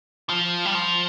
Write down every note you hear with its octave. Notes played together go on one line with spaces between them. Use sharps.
F3
G3
F3